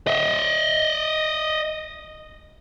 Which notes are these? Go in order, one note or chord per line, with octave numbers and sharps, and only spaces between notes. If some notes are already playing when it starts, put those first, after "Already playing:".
D#5 E5